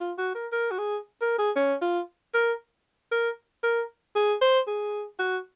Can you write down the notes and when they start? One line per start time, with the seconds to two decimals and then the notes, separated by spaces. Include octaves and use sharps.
0.01 F4
0.18 F#4
0.35 A#4
0.52 A#4
0.71 F#4
0.78 G#4
1.21 A#4
1.39 G#4
1.56 C#4
1.82 F4
2.34 A#4
3.12 A#4
3.63 A#4
4.16 G#4
4.41 C5
4.67 G#4
5.19 F#4